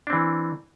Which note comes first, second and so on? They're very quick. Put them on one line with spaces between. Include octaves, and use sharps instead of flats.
D4 C4 E3